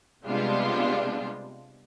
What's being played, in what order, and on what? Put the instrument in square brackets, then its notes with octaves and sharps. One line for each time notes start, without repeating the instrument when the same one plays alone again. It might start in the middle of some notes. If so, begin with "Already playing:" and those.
[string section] C3 G3 G#3 B3 D4 F4